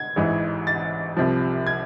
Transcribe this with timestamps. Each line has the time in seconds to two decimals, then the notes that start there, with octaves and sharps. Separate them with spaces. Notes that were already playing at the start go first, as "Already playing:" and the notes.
Already playing: G#6
0.16 A1 G#2 E3
0.67 A6
1.17 C2 C3 F3
1.67 G#6